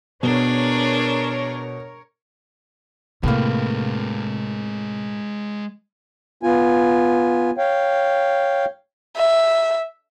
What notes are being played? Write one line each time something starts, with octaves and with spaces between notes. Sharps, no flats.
B2 D4 G#4 A#4 C#5
A2 C3 G#3 A#3 B4
B3 F4 G#5
C#5 F5 G5
E5